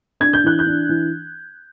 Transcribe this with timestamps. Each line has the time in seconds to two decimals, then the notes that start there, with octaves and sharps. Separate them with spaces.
0.20 D4 G#6
0.33 G6
0.44 E3 F#6
0.59 G6
0.67 D4
0.89 E3